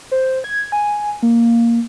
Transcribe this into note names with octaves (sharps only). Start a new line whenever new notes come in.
C5
G#6
G#5
A#3